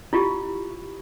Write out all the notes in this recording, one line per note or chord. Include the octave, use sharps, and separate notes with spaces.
E4 F4 G4